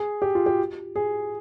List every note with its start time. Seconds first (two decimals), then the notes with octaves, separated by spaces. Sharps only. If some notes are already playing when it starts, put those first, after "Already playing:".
Already playing: G#4
0.22 G4
0.35 F4
0.46 G4
0.96 G#4